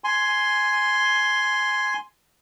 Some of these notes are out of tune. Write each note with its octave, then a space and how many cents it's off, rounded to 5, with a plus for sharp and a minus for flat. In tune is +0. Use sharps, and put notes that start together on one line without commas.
G#5 +5 C6 +0